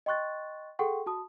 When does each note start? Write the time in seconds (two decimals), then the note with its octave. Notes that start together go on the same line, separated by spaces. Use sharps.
0.06 D#5 G5 C6 C#6 F#6 A6
0.79 G#4 A4 F#5 G5 C6 C#6
1.06 F#4 A5 D#6